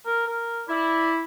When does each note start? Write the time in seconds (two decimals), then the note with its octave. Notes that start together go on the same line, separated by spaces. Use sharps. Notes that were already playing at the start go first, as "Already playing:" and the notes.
0.06 A#4
0.27 A#4
0.69 E4 D5